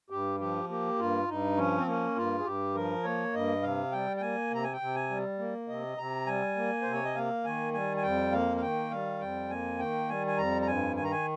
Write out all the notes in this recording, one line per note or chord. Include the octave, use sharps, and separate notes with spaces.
G2 G4
F3 G4
A#3 G4
G2 F4
G2 D#4
F3 C#4
C4
A#3 C#4
G2 F4
G#4
G2 G4
F3 A#4
A#3 C#5
G2 D#5
C3 F5
G3 G5
G5
A#3 G#5
C3 A#5
G#5
G5
C3
G#5
G3
A#3
C3 D#5
C3 A#5
G3 G#5
A#3
C3 C5
C#5
D#5
A#3 F5
D#3 G#5
G3 G#5
G#5
F2 G5
A#3 F5
F5
D#3 G5
G3 F5
F2 G5
A#3 G#5
D#3 G5
G3 G#5
G#5
F2 A#5
A#5
G2 G#5
D#3 G#5
A#5
G#5